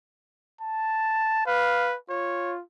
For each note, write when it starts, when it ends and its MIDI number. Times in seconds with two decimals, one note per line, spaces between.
0.61 1.45 81
1.47 1.96 71
1.47 1.93 77
2.10 2.61 65
2.10 2.54 73